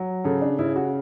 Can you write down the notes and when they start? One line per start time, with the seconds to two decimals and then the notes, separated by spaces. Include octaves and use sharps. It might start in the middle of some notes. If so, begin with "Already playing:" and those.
Already playing: F#3
0.24 C#3 A4
0.41 D4
0.59 C#3 E4
0.76 F#4